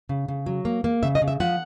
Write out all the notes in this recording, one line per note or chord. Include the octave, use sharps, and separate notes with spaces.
C#3
C#3
F#3
A#3
A#3
C#3 E5
D#5
C#3
E5
F3 F#5